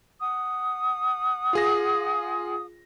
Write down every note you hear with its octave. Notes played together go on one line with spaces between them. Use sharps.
F#5 D#6
F4 G#4 A#6